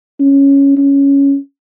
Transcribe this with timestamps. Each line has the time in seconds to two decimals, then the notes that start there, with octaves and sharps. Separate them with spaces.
0.20 C#4
0.77 C#4